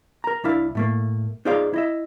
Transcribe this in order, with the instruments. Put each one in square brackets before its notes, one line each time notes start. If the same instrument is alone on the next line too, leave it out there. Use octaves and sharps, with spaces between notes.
[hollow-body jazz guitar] A#4 A#5
C2 D4 E4 F5
A2 A3 A#3
D#4 F4 G#4 C5 D5 F5
E4 D#5 E5